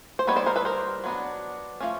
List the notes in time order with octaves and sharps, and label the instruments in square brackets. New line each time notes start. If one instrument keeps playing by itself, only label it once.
[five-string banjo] C5
G3 B3 D#4 B4 C#5
C5 D5
A#4 C5
A4 B4
A#4 C5
F#3 B3 D4
F3 A3 C#4